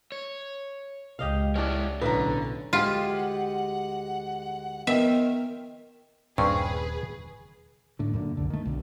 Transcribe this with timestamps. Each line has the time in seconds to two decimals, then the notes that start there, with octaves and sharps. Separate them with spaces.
0.12 C#5
1.19 C#2 G4 D#5 F5
1.56 G#3 C#4 D4 E4 D5
2.02 B1 A2 D3 C#4 B4 A#5
2.73 D2 G#3 F4 G4 F#5
4.87 D#3 F3 B3 A#4 E5 G5
6.38 D#1 G2 C4 C#4 G#4 B4 C#6
7.99 A2 D3
8.14 F#2 A#2 D3
8.37 C2 D3
8.50 D#3 A3
8.65 B1 D3